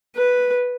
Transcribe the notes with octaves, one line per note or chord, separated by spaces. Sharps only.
B4